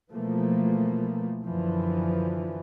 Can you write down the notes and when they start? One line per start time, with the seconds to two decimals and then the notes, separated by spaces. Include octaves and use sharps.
0.11 B2 E3 F3 A3 A#3
1.43 F#2 D3 E3 F3